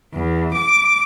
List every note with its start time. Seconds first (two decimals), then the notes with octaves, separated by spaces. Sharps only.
0.13 E2
0.52 D6